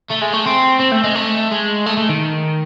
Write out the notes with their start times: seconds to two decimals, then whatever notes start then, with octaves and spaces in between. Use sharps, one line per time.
0.10 A3
0.21 G#3
0.33 A3
0.46 C4
0.80 C4
0.92 A3
1.04 G#3
1.15 A3
1.51 G#3
1.86 A3
1.97 A3
2.09 D#3